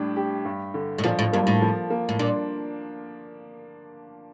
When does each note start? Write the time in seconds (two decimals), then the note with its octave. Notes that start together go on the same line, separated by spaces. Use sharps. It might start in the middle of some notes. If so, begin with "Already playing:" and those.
Already playing: A2 G3 D4
0.16 G4
0.45 G2
0.74 D3
0.98 A2
1.04 A#2 F3
1.19 A2
1.33 G2 A#3
1.47 A2
1.62 F3
1.90 A#3
2.09 A2
2.19 A#2 D4